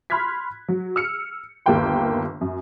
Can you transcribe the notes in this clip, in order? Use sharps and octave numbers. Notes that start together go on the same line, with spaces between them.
B5 C6 F6 F#6 G#6 B6
F#3
E6 F6 C#7
G1 D#2 A#3 F5 G5 C6
F#2